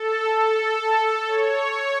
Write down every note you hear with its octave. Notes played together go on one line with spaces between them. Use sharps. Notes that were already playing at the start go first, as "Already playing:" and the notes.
Already playing: A4
A4
C#5